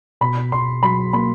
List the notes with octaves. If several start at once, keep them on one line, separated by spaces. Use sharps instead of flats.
B2 B5
B2 C6
F#3 B5
A#3 B5